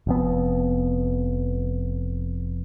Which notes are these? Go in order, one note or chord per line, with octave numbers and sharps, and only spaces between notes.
F1 F2 B3